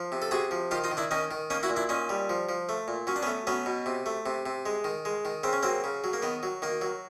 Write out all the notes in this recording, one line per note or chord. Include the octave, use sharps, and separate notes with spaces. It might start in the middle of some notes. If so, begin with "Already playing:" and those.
Already playing: F3
C3
A4
C3 F#4 G#4
F3
D#3 F4 G4
D#4 F4
D#3
D4 E4
D#3 C#4 D#4
D#3
A#3 C#4 D#4
E4 F#4
A#2
D4 E4
A#2 C#4 D#4
G3
F3
F3
A3
A#2
F#3 C#4
D4
B3 C#4
A3
F#3 B3 C#4
B2
C3
A3
C3
C3
G#3
D#3
G#3
D#3
C#3 C4
C#4
F#3 A#3 C4
C#3
F#3
A#3
D#3 B3
F#3
D#3 A#3
F#3